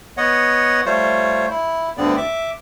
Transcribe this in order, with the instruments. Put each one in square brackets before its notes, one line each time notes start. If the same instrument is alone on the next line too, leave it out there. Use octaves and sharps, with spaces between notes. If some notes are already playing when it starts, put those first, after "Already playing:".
[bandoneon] B3 C#5 D#5 F#5
G3 A3 F4 C5 C#5
E4
D2 G2 D3 B3 C4 D5
E5 D6